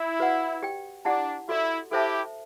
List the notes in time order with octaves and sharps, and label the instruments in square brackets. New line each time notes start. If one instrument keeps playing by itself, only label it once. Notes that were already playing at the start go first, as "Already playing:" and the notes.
Already playing: [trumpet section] E4
[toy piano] F#4 B4 D5 F#5
G4 D5 G5
[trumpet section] D4 [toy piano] E4 G4 D5 F#5 A5
[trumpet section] E4 [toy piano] F#4 A4 D5
[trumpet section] E4 G4 [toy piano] A4 C5 E5 A5